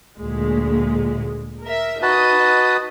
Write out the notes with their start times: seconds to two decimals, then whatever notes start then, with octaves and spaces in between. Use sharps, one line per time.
0.18 D2 A#2 G#3
1.63 A#4 E5
2.02 D#4 F#4 B4 D#5 A5 D#6